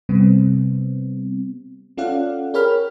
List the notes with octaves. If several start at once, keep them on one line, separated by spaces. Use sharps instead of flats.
C3 G3 B3 C4
C#4 F4 A4 D5 F5 F#5
G#4 A#4 C#5 G5 B5 F6